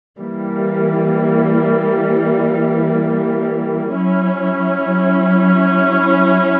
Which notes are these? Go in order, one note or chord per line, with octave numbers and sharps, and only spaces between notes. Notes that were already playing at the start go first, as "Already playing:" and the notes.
E3 G3 A#3
F#3 C#4 E4